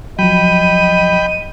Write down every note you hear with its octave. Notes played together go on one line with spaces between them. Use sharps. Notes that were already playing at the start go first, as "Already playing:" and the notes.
F3 F#3 D#5 G5 B5 D#7